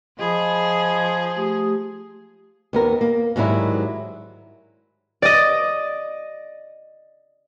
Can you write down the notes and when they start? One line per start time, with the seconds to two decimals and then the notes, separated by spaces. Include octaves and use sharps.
0.19 F3 G#4 D#5 B5
1.36 A3 G4 D#6
2.73 D#2 B3 A#4
3.01 A#3
3.36 G#2 D#3 F#3 G3 E4
5.22 D5 D#5